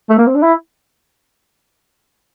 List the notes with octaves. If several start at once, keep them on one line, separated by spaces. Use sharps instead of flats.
A3
A#3
C4
D4
E4